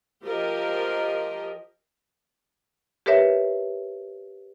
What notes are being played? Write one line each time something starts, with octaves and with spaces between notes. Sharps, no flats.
F3 G4 A#4 D#5
G4 A#4 B4 C#5 E5